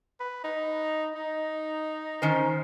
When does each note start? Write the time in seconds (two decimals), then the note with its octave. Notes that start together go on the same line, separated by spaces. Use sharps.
0.20 B4
0.44 D#4
1.15 D#4
2.22 D#3 C#4 C5